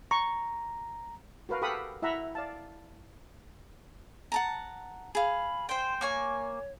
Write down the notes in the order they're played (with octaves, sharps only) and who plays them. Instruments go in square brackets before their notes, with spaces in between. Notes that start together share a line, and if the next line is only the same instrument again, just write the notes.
[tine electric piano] A#5 [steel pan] C#6
[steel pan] F#4 A#4 B4 F5
G4 A4 F5 F#5 B5 D#6
E4 E5 F#5 A#5 B5
D5 F5 A5
[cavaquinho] F#5 A5 A#5
[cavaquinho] G#4 F5 [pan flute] B5
[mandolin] C5 G5 [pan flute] C6
[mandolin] A#3 G#5 C#6 [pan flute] C#5